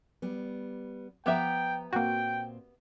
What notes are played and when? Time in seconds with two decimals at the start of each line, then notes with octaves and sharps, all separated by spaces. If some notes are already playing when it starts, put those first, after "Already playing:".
0.22 G3 B3
1.26 F3 B3 G4 E5 G5 A#5
1.93 A#2 A#3 C4 F#4 G5